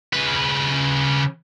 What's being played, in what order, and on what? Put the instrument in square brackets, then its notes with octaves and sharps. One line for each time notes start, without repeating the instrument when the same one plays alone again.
[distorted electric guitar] C#3 B4